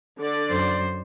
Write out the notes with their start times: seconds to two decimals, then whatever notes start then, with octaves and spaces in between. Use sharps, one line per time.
0.20 D3 D5
0.50 F#2 C5